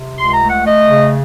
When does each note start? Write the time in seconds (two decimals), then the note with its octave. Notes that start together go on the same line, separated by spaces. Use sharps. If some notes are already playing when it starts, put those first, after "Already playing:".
Already playing: C3
0.17 C#2 C6
0.33 A#5
0.41 A3
0.49 F#5
0.64 A3 D#5
0.88 C#3